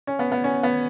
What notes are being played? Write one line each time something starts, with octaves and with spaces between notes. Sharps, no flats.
C#4
B3
B3
C#4
B3